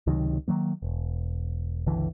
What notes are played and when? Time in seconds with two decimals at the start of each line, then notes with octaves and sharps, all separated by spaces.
0.07 C#2 C3 D#3 F#3
0.48 D#3 F#3 A#3
0.82 E1
1.86 G1 C#2 D3 E3